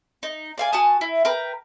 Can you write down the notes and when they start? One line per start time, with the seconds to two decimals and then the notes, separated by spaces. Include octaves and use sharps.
0.23 D#4
0.58 D5 F5 G#5
0.72 F#4 G#5 A5 D#6
1.01 E4
1.25 A#4 B4 G5 A#5